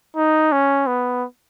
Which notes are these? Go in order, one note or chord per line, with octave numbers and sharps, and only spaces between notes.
D#4
C#4
B3